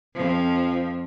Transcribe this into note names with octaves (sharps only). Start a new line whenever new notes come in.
F2 F3